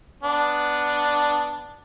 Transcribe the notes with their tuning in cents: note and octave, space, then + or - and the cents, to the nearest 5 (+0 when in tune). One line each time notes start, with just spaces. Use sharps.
B3 +0 D4 +0